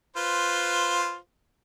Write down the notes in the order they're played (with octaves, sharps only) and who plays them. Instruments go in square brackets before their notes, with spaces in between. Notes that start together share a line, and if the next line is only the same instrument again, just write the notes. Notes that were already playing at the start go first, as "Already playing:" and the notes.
[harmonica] F4 B4 C5